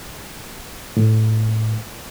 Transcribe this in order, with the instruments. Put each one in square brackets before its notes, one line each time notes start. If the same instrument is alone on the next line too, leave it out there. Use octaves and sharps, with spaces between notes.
[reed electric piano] A2